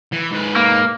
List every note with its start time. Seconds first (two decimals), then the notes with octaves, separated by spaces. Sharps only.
0.12 E3
0.31 G#2 B4
0.56 A#3